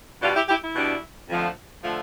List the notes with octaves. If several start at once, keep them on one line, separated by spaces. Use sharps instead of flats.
B2 G3 D4 F4
E4 G4
E4 G4
E4
B2 G3 D4
F2 D3 F3 A3
D3 F3 A3 F4